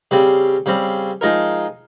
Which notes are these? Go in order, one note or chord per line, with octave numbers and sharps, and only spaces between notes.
C#3 G3 C4
C#3 G3 C4
F3 G#3 D#4 A#4